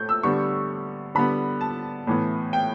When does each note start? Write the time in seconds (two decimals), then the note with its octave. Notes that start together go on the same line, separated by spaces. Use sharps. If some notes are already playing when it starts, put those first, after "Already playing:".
Already playing: A2 A3 G6
0.09 E6
0.23 D3 G3 B3 C#6
1.15 D3 G3 B3 B5
1.61 A5
2.07 A2 E3 B3
2.53 G5